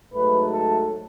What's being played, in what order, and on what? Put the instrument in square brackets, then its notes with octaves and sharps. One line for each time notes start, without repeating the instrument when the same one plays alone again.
[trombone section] G#2 F#3 A3 B4
A4